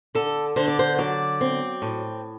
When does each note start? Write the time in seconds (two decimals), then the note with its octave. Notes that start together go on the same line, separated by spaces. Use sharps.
0.15 D3 A4
0.56 D3 C5
0.68 D5
0.79 C5
0.98 F#3 D5
1.41 C4
1.82 A2